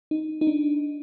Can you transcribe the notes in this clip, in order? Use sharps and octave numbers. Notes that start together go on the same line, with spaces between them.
D#4
D#4
D4